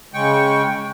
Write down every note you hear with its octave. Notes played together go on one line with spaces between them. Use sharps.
C#3 G#3 G5 C#6